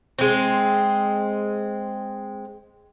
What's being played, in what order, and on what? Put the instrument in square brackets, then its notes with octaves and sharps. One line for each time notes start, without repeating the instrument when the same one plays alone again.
[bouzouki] G#3 C4